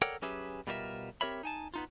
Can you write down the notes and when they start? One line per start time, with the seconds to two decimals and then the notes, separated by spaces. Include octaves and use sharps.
0.02 A4 A#4 C#5 D5 F#5 G5
0.22 F#3 C#4 G4 G#4 B4 E5
0.67 B2 G3 F4 A#4 C5 E5
1.21 C4 G4 A#4 C#5 E5 B5
1.43 D#4 G#5 A5
1.74 B3 D#4 F4